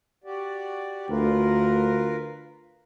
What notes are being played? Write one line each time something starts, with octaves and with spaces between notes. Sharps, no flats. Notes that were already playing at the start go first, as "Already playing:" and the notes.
F#4 G4 D5
D2 F4 A#4 B4